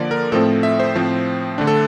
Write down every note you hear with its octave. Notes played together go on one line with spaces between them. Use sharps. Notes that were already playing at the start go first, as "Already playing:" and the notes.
Already playing: D3 F3 A#3 D5
A#4
A2 F3 A3 C4 A4
E5
C5
A2 F3 C4
D3 A3 D4
A4